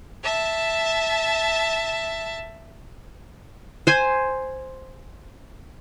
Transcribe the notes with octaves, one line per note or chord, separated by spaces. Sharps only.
E5 A5
C5 G#5